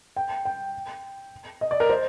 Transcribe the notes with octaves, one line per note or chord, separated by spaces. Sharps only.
G5
G5
D#5
D5
A#4
C5